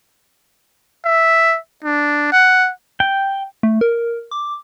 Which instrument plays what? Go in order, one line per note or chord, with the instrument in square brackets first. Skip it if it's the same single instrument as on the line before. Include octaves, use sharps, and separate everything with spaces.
[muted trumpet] E5
D4
F#5
[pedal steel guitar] G5
[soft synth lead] A3
A#4
D6